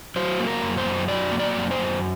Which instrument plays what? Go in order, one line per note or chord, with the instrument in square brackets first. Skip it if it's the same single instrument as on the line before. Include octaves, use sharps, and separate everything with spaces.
[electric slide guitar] F#3 C5
A#3
A#4
F#2
C5
F#2
F#3 D5
A#3
D5
F#2
C5
F#2